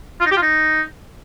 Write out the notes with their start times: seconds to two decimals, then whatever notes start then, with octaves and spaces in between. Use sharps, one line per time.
0.20 F4
0.26 D#4
0.31 G4
0.36 F4
0.42 D#4